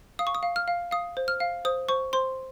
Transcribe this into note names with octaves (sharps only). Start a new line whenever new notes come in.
F5 D#6
C#6
D#6
F5
F6
F5
F5 D#6
C5
F6
F5
C5 D#6
C5 C#6
C5 C6